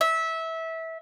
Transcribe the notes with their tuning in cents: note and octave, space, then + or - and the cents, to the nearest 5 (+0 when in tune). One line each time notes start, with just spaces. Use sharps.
E5 -20